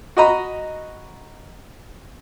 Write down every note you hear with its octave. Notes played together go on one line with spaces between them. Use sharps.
F#4 D#5 A#5 B5